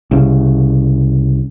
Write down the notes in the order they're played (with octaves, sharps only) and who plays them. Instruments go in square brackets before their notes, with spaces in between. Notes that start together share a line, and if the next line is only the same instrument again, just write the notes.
[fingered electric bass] C2 C#3